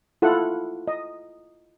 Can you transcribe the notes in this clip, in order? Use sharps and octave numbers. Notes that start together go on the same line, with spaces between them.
E4 F4 A4 F#5
D#5